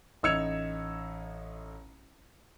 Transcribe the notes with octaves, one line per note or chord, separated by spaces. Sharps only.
A1 D#4 E6 G#6 C#7 F7